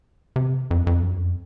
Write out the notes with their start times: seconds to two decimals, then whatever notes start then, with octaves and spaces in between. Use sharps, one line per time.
0.36 C3
0.71 F2
0.87 F2
1.02 F#2
1.17 F2